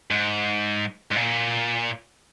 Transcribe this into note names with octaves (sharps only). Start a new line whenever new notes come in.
G#2
G#2
A#2